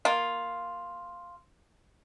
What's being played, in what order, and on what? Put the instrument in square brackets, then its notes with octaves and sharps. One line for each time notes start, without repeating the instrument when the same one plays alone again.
[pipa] A#3 F4